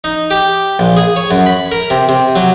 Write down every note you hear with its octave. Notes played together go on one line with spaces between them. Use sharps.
D#4
G4
A#1
G#4
C#5
F#2
B5
A#4
C3
C3
F#3